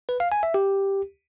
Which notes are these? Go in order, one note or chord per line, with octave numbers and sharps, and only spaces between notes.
B4
F5
G#5
E5
G4